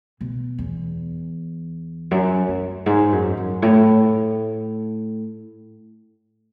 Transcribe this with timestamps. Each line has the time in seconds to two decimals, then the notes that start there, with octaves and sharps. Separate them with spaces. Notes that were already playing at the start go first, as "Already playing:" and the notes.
0.21 B2
0.58 E2
2.11 F#2
2.48 F#2
2.86 G#2
3.12 F#2
3.37 F#2
3.62 A2